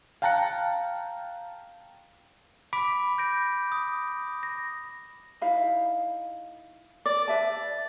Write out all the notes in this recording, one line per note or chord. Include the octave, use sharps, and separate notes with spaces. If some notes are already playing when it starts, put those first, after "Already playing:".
F5 G5 A5 A#5 F#6 C#7
B5 D6 B6 D7
G6 A#6 D7
D#6
A#6
D#4 E4 F5
D5
B4 E5 A5